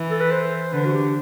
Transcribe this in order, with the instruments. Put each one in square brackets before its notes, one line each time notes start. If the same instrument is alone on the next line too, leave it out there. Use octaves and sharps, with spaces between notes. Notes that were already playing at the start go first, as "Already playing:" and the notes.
Already playing: [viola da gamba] E3
[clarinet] A4
B4
C5
[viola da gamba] D3 [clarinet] B4
[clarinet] F#4
G4